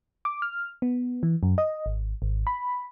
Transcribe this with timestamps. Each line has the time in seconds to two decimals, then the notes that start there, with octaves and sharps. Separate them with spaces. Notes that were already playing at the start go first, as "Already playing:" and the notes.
0.25 D6
0.42 F6
0.82 B3
1.23 E3
1.43 F#2
1.58 D#5
1.86 G#1
2.22 G#1
2.47 B5